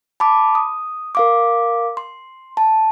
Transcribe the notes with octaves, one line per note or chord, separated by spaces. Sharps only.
A5 B5 D6
D#6
A#4 F5 D6
C6
A5